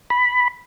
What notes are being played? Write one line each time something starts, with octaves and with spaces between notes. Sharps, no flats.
B5